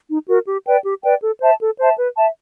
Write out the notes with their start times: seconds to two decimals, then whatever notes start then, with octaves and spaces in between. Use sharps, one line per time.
0.09 D#4
0.27 F#4 A#4
0.46 G4
0.66 B4 D5 G5
0.84 G4
1.03 B4 D5 G5
1.21 A4
1.40 C5 E5 A5
1.59 A4
1.78 C5 E5 A5
1.97 B4
2.15 E5 A5